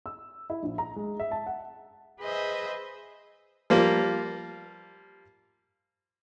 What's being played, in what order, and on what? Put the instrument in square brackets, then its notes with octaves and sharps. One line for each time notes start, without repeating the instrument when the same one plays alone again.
[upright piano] E6
E4
A#1
A#5
G#3
E5
A5
F#5
[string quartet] G#4 B4 C5 D#5 E5
[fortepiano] F3 G3 A#3